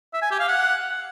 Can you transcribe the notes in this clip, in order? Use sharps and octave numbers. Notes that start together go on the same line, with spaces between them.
E5
G#5
G4
F5
F#5